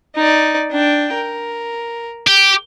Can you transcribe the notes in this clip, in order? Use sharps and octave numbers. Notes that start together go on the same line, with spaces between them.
D#4 D5
D4 G5
A#4
G4